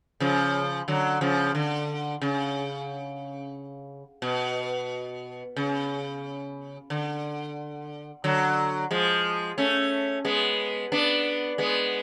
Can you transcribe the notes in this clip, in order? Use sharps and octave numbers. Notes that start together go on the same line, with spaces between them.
C#3 F3
D3 F#3
C#3 F3
D3
C#3
B2
C#3
D3
D3 F#3
F3 G#3
A3 C#4
G#3 B3
B3 D4
G#3 B3